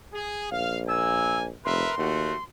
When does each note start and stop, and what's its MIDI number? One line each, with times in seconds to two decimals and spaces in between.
0.13 0.47 68
0.52 1.51 34
0.52 0.79 77
0.88 1.47 58
0.88 1.47 80
0.88 1.37 88
1.65 1.85 29
1.65 1.93 70
1.65 1.93 71
1.65 1.93 76
1.65 2.43 84
1.98 2.32 39
1.98 2.34 57
1.98 2.34 66